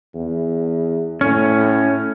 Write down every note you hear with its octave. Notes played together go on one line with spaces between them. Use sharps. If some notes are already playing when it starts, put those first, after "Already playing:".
E2
A2 C#4